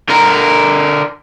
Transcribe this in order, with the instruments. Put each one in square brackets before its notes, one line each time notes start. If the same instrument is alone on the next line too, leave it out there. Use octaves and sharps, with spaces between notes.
[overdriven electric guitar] D3 A#4